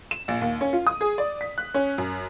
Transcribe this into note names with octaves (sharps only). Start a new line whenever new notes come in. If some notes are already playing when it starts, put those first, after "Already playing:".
E7
A#1
D#2
C#4
F4
D#6
G#4
D5
B6
F#6
C#4
F#2